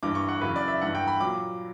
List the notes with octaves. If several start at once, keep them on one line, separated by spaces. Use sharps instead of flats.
G2 E3 D6
C#6
F#5
F#2 C#3 E3 B4
D5
E5
G2 E3 F#5
G5
B5
A#2 F#3 D6